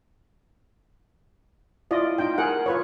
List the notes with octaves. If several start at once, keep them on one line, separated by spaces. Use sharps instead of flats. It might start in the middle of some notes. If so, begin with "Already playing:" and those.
E4 F4 D5 D#5
D#4 F4 G5
G#4 A#4 F#5
F4 B4 C#5